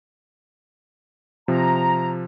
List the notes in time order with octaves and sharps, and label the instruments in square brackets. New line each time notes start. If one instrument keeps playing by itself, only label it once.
[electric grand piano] C3 F3 [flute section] A#5